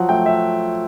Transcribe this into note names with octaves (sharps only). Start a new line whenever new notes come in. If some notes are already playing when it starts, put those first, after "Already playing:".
Already playing: F3 F#3 F#5
A3 G5
E5